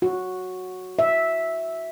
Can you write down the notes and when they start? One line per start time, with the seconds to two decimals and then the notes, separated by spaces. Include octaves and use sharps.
0.02 F#4
0.99 E5